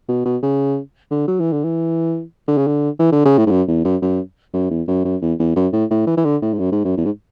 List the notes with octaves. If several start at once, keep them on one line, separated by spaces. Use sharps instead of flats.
B2
B2
C#3
D3
F#3
E3
D3
E3
D3
C#3
D3
E3
D3
C#3
A2
G#2
F#2
E2
F#2
F#2
F#2
E2
F#2
F#2
E2
E2
F#2
A2
A2
E3
E3
D3
A2
G#2
F#2
G#2
F#2
E2
G#2